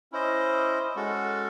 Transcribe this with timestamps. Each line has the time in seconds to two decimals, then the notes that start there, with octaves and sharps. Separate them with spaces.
0.12 C#4 E4 C5 D#5
0.96 G#3 C#4 F#4 A4